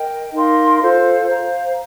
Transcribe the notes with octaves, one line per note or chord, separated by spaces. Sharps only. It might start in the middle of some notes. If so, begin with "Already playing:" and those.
Already playing: A#4 D#5 G5
D#4 A#4 F5 C6
F4 A4 C5 F5
C5 F5 A#5